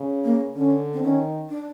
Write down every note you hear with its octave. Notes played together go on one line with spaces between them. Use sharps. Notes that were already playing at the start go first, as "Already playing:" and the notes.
Already playing: C#3
A#3
D3 C#4
C4
D#3 C#4
D4